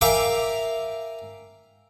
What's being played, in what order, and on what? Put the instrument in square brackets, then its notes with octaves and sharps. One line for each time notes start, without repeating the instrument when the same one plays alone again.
[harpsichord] A#4 E5 F5 G5 G#5 D6